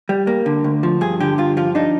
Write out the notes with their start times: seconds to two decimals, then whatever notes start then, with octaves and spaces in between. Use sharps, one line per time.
0.09 G3
0.27 A#3
0.46 D3
0.64 D2
0.83 F3
1.01 G2 G#4
1.20 D3 G4
1.38 G2 F4
1.57 F3 F4
1.75 D4 D#4